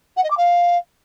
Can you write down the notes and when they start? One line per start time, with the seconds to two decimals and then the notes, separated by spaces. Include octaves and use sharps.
0.17 F#5
0.24 D#5
0.31 D6
0.37 F5